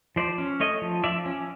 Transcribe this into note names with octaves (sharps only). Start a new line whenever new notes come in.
F3 C5 D5
C#4
A3 C#5 D#5
F3
F3 D5 E5
C#4